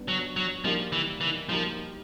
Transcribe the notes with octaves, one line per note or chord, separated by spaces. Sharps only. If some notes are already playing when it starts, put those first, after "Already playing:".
Already playing: G3 B3 D4
F#3
F#3
F3 G3 A#3 D#4 G4 A#4
E3
E3
F3 G3 A#3 D#4 G4 A#4